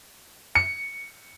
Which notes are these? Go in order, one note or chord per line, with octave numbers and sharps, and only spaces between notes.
C#7